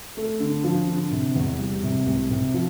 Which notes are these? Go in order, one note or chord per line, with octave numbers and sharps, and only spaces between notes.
A3
D3
F3
D3
C3
E2
G3
C3
C2
C3
F3